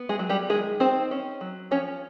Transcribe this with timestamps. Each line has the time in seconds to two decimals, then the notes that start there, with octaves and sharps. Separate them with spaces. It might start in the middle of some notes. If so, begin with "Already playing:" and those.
Already playing: B3
0.09 G#3 G#4
0.19 F#3
0.29 G3 G4
0.49 D#3 G#3 G#4
0.80 C4 D#4 C5
1.11 C#4
1.41 F#3
1.71 F3 C#4 C#5